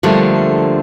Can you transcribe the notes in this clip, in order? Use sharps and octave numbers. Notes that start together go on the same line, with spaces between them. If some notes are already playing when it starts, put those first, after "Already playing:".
D3 F3 G3 A3 A#3